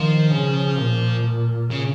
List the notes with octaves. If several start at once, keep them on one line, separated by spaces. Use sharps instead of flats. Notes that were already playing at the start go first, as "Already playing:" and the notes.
Already playing: D#3 F3
C#3
A#2
C#3